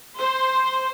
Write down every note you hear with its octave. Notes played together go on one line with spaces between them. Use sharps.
C5